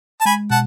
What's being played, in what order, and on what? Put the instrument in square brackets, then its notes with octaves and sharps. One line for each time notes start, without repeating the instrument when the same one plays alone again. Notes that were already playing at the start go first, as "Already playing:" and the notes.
[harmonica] A5
[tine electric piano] G#3 [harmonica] G#5 B5
[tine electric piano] B2 [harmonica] F#5 A5